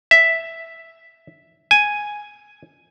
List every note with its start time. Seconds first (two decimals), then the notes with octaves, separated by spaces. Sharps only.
0.11 E5
1.71 G#5